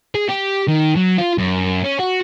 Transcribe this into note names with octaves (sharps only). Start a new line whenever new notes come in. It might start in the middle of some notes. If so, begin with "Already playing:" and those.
G#4
G4
D#3
F#3
F4
F#2
C#4
F#4